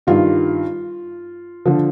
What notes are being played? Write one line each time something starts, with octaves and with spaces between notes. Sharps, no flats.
G2 D#3 F4
D3 F3